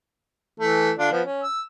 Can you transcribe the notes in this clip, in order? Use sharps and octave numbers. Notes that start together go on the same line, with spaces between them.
E3 A3
D3 D4 F4
F3 B3
C#4
E6